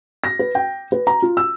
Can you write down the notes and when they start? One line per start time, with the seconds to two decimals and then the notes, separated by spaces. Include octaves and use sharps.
0.24 A#6
0.39 B4
0.55 G5
0.92 B4
1.07 A#5
1.22 F4
1.37 E6